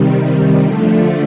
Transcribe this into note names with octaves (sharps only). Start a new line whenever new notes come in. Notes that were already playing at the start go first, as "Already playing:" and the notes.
Already playing: C3 D#3 G3
D3 F3 A3